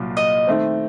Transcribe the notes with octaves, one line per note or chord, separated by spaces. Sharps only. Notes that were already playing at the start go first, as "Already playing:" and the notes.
Already playing: C2 A#2 F#3 A#3
D#5
D#3 A3 C4